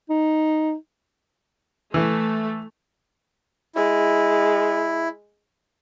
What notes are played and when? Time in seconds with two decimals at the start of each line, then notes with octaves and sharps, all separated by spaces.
0.10 D#4
1.94 E3 A3
3.76 G#3 E4